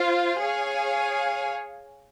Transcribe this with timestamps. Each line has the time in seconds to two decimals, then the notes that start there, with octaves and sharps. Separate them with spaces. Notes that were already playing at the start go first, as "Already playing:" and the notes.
Already playing: F4 C5 F5
0.40 G#4 C#5 F5 G#5